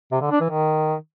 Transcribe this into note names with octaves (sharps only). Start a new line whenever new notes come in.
C3
D3
D4
E3
D#3